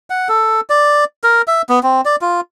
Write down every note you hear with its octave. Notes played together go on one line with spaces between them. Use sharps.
F#5
A4
D5
A#4
E5
B3
C4
D5
F4